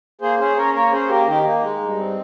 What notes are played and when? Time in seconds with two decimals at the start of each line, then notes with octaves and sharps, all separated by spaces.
0.21 A#3 G#4 C5
0.39 C#4 G#4 C5
0.57 C#4 A#4 C#5
0.74 A#3 A#4 C#5
0.92 C#4 G#4 C5
1.09 A#3 G4 A#4
1.27 D#3 D#4 G4
1.44 A#3 D#4
1.62 G#3
1.80 G2
1.97 C4